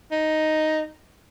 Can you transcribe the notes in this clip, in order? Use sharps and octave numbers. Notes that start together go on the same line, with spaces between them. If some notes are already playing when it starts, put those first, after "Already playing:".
D#4